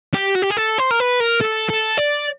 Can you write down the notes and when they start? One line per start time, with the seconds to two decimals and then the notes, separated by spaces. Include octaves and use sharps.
0.14 G4
0.35 F#4
0.42 G4
0.50 G#4
0.57 A4
0.78 C5
0.91 A#4
1.00 B4
1.20 A#4
1.41 A4
1.70 A4
1.98 D5